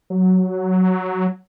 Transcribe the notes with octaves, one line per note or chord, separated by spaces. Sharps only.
F#3